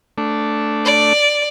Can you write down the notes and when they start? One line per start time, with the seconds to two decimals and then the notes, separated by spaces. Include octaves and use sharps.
0.18 A3 D4
0.85 D5